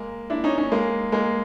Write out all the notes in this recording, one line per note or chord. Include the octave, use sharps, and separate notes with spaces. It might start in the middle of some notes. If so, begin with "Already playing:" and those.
Already playing: G#3 A#3
D4 E4
C#4 D#4
C#4 D#4
G#3 A#3
G#3 A#3